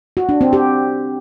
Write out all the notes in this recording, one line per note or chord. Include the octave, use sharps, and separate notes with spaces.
F#4
D4
C4
G4